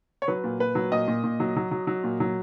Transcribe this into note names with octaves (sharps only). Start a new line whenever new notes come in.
C#5
F#3 B4
A#2
A#2 B4
F#3
A#2 D#5
A#2
A#2
F#3
F#3
F#3
F#3
A#2
F#3